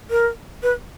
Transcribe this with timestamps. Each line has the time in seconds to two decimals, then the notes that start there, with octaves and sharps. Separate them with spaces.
0.10 A#4
0.63 B4